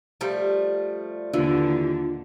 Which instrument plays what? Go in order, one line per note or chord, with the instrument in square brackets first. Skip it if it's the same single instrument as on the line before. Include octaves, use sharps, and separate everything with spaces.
[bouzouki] F3 G3 A3
[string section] D#2 D3 [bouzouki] E3 [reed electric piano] D4 F4